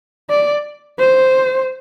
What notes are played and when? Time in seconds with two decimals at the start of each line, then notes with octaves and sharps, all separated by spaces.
0.30 D5
0.99 C5